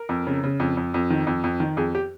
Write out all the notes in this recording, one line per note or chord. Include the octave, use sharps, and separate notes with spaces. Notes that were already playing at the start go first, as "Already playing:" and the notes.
Already playing: A#4
F2
C#3
C#3
F2
F2
F2
D#3
F2
F2
D#3
F2 G#4
G4